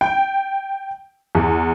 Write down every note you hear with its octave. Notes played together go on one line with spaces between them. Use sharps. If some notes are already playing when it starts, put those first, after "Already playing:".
G5
E2